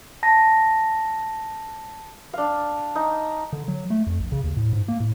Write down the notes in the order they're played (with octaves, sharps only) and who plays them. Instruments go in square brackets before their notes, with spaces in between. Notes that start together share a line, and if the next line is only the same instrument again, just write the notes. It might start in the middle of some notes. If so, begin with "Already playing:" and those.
[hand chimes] A5 A#6
[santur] D4 F5
D#4
[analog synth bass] D3
F#3
A3
F2
A#1
C#3
D#2
A2
G#2
A#3
A2